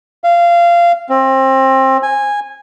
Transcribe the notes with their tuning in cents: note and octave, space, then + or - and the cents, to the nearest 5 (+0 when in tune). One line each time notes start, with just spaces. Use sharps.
F5 -20
C4 +25
G#5 -15